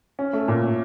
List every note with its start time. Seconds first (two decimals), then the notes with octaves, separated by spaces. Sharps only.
0.19 C#4
0.33 A3
0.48 A#2
0.63 C#4